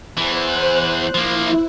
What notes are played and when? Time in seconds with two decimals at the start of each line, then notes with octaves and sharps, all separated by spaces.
0.18 E2 E3 C5 F#6
1.15 F3 A#3 E4